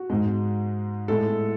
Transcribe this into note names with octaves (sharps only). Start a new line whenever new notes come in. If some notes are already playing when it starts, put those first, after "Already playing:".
Already playing: F#4
G#2 G#3
A2 G#3 A4